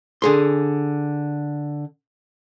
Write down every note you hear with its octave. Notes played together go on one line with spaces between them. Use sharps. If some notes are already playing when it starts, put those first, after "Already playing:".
D3 G#4 C6